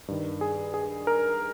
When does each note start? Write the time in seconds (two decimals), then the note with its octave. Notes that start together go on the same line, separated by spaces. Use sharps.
0.08 G2 D#3
0.41 G#4
0.74 G#4
1.07 A#4